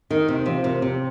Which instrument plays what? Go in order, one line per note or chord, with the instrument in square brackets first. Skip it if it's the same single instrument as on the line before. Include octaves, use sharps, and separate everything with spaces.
[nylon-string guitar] D#3 [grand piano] D#4
[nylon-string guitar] C3 [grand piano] C4
[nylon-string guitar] C3 [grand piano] F3
[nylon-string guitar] C3 [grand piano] A#4
[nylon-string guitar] C3 [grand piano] C4